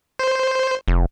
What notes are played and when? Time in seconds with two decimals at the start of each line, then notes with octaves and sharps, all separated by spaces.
0.19 C5
0.88 F1